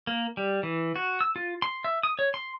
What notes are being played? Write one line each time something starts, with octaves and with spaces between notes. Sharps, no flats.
A#3
G3
E3
F#4
E6
F4
C6
E5
D#6
C#5
C6